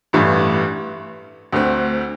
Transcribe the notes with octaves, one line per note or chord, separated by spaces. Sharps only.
A1 G2 E3 A3 E4
D2 D3 A3 C4